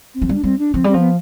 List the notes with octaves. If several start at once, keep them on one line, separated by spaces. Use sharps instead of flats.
C4
F3
G3
D4
G3 C4
D4
F3 C4
G3 C4
F3
B3